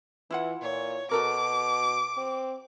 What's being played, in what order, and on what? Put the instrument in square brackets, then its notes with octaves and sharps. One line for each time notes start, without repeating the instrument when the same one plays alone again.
[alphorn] E3 [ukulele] E4 F4 F#5
[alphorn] A#2 [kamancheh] C#5
[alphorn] B2 [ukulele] F#4 A4 A#4 [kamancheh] D6
[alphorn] C4